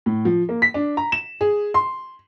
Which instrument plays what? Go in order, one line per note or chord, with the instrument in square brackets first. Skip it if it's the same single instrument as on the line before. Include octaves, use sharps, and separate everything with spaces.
[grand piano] A2
F3
A#3
B6
D4
A#5
E7
G#4
C6